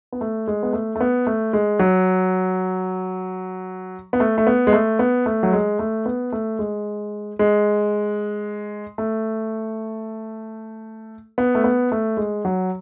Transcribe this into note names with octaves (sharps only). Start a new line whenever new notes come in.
B3
A3
G#3
B3
A3
A3
B3
A3
G#3
F#3
B3
A3
A3
B3
G#3
A3
B3
A3
F#3
G#3
A3
B3
A3
G#3
G#3
A3
B3
A3
B3
A3
G#3
F#3